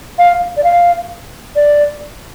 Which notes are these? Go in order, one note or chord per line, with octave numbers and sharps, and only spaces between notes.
F5
D5
F5
D5